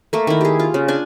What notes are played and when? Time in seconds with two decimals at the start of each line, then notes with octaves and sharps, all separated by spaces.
0.13 A3 A#3
0.27 D#3 E4
0.41 G4 G#4
0.59 F4
0.74 C#3
0.88 D4 G#5